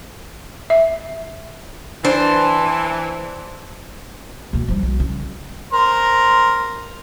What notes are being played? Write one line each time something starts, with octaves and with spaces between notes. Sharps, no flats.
E5
E3 D4 C5
B2 A#3
F3 G3
B1
C#3
A#4 C5